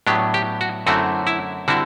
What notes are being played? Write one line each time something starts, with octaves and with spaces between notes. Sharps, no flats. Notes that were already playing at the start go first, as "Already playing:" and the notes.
A2 F#3 B3 D4 G4
G4
F#4
F#2 D3 A3 C4 E4 F#4
E4
D3 G3 C4 E4 F#4